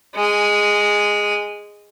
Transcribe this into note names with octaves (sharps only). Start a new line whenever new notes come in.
G#3 G#5